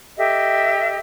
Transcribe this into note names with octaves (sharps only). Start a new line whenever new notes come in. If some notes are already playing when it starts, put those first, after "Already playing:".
G4 A4 D#5 E5